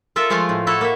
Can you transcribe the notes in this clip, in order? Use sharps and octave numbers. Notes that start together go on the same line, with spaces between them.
F4 A4 A#4 E5
F3 G#3 A3 F4 F5
A2
E4 F#4 A4 C#5
A#3 E5